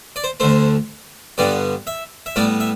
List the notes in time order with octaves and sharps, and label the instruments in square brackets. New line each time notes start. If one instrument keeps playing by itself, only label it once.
[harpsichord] D5
C5
D2 D3 A3 C5
G2 D3 G3 B3 D5
E5
E5
A2 G3 B3 D5
E5